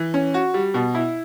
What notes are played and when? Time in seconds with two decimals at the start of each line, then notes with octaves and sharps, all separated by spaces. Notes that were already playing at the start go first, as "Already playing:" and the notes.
Already playing: E3
0.14 C#4
0.34 F#4
0.54 G3
0.74 B2
0.95 E4